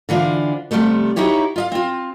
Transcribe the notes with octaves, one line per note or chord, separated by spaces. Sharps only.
D3 E3 D4 F4 C5
C3 F3 G3 A3 B3
D#4 E4 F#4 G4 C#5
F4 D#5 F5
C4 F4